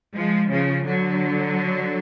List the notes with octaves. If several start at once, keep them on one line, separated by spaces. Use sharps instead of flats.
F3 G#3
C#3 F3
D3 F#3